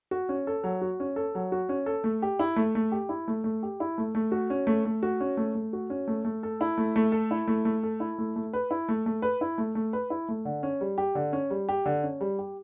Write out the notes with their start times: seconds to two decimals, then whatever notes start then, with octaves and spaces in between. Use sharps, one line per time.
0.11 F#4
0.29 C#4
0.47 A4
0.64 F#3
0.82 F#4
1.00 C#4
1.16 A4
1.35 F#3
1.52 F#4
1.69 C#4
1.86 A4
2.04 A3
2.22 G4
2.39 E4
2.56 A3
2.75 A3
2.92 G4
3.09 E4
3.28 A3
3.44 A3
3.63 G4
3.80 E4
3.98 A3
4.15 A3
4.32 F#4
4.50 C#4
4.67 A3
4.85 A3
5.03 F#4
5.20 C#4
5.37 A3
5.55 A3
5.73 F#4
5.90 C#4
6.08 A3
6.25 A3
6.43 A4
6.61 E4
6.78 A3
6.96 A3
7.12 A4
7.31 E4
7.48 A3
7.65 A3
7.83 A4
8.00 E4
8.18 A3
8.36 A3
8.53 B4
8.71 E4
8.89 A3
9.06 A3
9.22 B4
9.41 E4
9.58 A3
9.75 A3
9.93 B4
10.10 E4
10.28 A3
10.45 D3
10.63 C#4
10.81 G3
10.98 G4
11.15 D3
11.33 C#4
11.50 G3
11.69 G4
11.85 D3
12.03 C#4
12.21 G3
12.39 G4